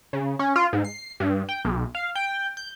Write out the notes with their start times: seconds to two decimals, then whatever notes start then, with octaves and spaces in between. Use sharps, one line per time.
0.13 C#3
0.39 C#4
0.56 F4
0.73 G#2
0.84 C7
1.20 G2
1.49 G5
1.65 B1
1.95 F5
2.15 G5
2.57 G6